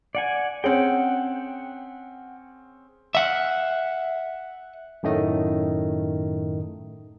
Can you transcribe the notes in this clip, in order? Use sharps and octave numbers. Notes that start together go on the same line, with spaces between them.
D5 F#5 G#5
C4 C#4 G#4 F#5 G5
E5 F#5
F#2 A2 D#3 A3 D#5